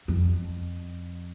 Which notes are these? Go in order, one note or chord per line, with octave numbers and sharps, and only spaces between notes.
F2